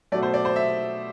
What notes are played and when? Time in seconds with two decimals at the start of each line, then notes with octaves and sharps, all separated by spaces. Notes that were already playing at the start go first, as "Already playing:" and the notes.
0.12 B2 F#3 A3 D5
0.22 C5
0.34 D5
0.45 C5
0.56 E5